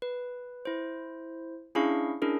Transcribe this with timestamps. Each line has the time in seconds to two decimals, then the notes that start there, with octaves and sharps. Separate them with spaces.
0.02 B4
0.65 E4 C5
1.75 C#4 D4 E4 G#4 F5 C#6
2.22 C#4 D4 E4 G#4 A#4